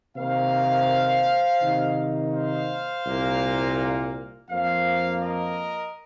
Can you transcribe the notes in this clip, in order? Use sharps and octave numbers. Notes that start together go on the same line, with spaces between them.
C3 D#3 A#3 C5 F5
C3 D#3 A#3 D#4
C5 F5
C2 A#2 A#3
F2 F3 A#3 C5 F5
A#4 D#5